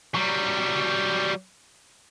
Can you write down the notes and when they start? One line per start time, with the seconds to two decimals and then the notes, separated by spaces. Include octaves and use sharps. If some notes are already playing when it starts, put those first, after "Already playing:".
0.15 F#3 G3